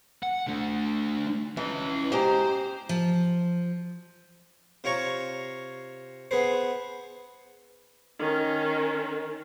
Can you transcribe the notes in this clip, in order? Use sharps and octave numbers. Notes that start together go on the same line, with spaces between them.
F#5
D3 A3
E3 C#4 D#5
G#3 G4 C5 A#5
F3
C3 F4 C#5 A#5 C#6
B3 G#4 B4 C5
D#3 C#4